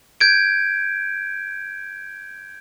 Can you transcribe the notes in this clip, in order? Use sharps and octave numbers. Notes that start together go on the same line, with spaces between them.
G6 G#6 D7